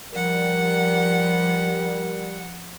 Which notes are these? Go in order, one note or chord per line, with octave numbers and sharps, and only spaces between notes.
F3 G3 A#4 F#5